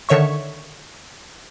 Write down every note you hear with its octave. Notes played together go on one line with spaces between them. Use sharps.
D3 D#3 C#5 E5 C#6